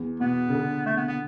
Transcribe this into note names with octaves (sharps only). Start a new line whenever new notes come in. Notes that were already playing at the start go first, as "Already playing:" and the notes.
Already playing: E2
B2 B3
C#3
D3
A3
B3
B3